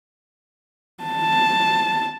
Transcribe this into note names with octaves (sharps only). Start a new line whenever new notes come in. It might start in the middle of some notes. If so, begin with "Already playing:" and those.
A5